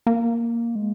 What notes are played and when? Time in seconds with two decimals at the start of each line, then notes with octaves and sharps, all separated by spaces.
0.07 A#3
0.76 G#3